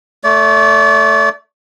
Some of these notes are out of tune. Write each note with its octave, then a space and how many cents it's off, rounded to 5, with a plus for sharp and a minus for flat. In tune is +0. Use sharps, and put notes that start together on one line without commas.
A3 +0 D5 -35